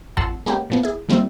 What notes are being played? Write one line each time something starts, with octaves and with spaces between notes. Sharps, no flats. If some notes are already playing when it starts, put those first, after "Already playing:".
A1 F2 F#5 A5 C6 E6
G#3 A#3 B3 C#4 G4
A#2 F3 B3
E4 G#4
D#3 F3 G3 A#3 C4 E4